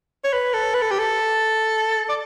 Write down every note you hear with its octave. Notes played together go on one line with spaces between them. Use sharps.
C#5
B4
A4
B4
A4
G4
A4
D5